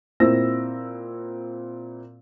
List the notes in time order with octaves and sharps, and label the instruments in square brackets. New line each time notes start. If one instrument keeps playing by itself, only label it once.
[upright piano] A#2 C4 E4 E6 A#6